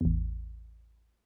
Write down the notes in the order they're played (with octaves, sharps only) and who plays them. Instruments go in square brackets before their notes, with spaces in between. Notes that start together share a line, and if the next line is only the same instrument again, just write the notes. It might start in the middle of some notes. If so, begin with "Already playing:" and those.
[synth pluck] A1 E2